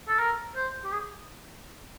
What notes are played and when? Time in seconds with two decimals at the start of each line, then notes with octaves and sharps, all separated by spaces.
0.08 A4
0.19 A#4
0.56 C5
0.84 G4
0.93 G#4